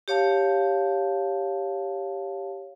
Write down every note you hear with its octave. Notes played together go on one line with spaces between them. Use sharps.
G4 C#5 F5 A5